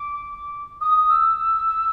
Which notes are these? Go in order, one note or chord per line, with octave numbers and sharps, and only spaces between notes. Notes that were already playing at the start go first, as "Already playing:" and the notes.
Already playing: D6
D#6
E6